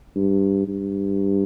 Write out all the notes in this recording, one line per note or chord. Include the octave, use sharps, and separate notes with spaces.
G2
G2